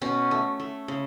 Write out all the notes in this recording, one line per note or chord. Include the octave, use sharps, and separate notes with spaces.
B2 C#4
A3
A3
C#3